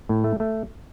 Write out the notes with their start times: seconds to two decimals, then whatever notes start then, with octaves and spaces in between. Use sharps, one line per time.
0.09 A2
0.24 A3
0.40 A3